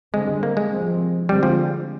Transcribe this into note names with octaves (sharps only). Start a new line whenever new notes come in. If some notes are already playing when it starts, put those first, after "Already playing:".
D3 G3 G#3 C4
A#3
G#3
C3 F3 C4
D3 G3 G#3 C4
F3